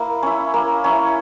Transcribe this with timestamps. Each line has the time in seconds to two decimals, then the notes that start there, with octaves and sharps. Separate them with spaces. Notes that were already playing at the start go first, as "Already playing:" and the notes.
Already playing: A#3 E4
0.23 C#4 E4
0.54 A#3
0.84 C#4 E4